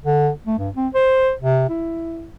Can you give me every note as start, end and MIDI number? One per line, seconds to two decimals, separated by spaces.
0.05 0.30 50
0.47 0.58 57
0.58 0.69 43
0.77 0.88 60
0.94 1.32 72
1.41 1.66 48
1.69 2.30 64